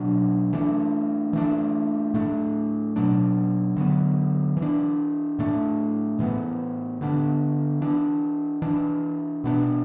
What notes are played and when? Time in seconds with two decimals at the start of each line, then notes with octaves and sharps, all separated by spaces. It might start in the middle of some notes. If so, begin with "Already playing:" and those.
Already playing: B2 F#3 D4
0.53 E3 A3 D4
1.33 E3 A3 D4
2.14 A2 A3 D4
2.96 B2 F#3 D4
3.77 D3 F#3 B3
4.57 E3
4.62 D4
5.39 A2 A3 D4
6.19 A2 E3 B3
7.01 D3 B3 D4
7.82 E3 D4
8.62 E3 D4
9.44 B2 B3 D4